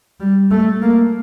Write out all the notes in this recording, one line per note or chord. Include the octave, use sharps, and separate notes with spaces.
G3
A3
A#3